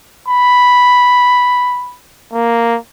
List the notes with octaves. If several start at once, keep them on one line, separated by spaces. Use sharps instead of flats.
B5
A#3